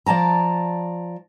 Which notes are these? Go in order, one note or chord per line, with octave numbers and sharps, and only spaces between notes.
F3 D5 A5 A#5